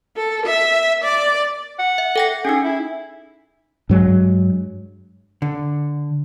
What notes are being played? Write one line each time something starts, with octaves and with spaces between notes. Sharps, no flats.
A4
E5
D5
F#5
E5
A4 G5 A#6
C#4 D#4 G#4
E4
G2 F#3 G#3
D3